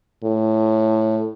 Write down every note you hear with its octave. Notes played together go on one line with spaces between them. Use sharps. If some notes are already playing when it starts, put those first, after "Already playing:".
A2